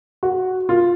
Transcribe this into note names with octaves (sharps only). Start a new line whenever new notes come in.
F#4
F4